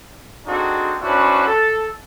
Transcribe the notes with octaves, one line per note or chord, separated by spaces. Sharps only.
C4 D4 D#4 F#4 G#4 A4
C#4 D4 E4 F#4 B4 C5
A4